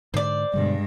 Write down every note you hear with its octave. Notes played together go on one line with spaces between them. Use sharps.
G#2 D3 C5 D5
G2 B2 D3 G3 G#3